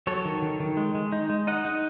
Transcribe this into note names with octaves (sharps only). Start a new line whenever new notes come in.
F#3 A4 C#5
D#3
D#3
D#3
G#3
G#3
D#4
G#3
D#4 D#5 F#5
D#4